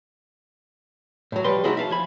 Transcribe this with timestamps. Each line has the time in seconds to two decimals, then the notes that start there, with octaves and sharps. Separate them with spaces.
1.32 A2 F#3
1.44 F3 G3 B4 C6
1.64 A3 C4 D#4 E4 F#4 G#4
1.77 E5 F5 A5
1.90 F3 G#5 B5